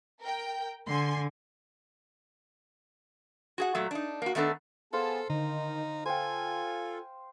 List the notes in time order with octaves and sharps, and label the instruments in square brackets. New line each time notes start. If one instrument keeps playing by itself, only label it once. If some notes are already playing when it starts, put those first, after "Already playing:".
[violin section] A#4 G5
[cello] D3 [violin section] G#5 C6
[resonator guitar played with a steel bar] F#4 G#4 F#5
A#2 F#3 A3
D4 D#4
A#3 F#4
D#3 A3 B3 D4 A4
[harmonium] B3 G#4 A5 [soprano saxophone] A4 [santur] C5 F5
[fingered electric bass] D3 [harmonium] D#3 [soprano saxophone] D#4
[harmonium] F4 A4 [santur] C5 G5 [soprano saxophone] G#5